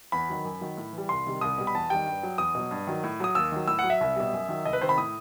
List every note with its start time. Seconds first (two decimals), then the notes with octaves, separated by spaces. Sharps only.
0.12 E2 B5
0.29 D#3 F#3
0.45 F#2
0.61 D#3 F#3
0.77 A2
0.93 E3 G3
1.09 C2 C6
1.26 C3 D#3 G3
1.41 C2 D#6
1.58 B2 G3
1.67 B5
1.75 E2 A5
1.90 D#3 G3 G5
2.06 G2
2.23 F#3
2.38 E2 D#6
2.55 B2 F#3
2.71 G2
2.87 D#3 F#3
3.04 A2
3.20 F#3 D#6
3.35 D#2 E6
3.52 D#3 F#3
3.67 A2 E6
3.79 F#5
3.84 F#3
3.90 E5
4.01 C2
4.16 B2 G3
4.33 F#2
4.49 D#3 F#3
4.65 C2 D#5
4.73 B4
4.81 C3 D#3 C5
4.89 B5
4.98 A2 D#6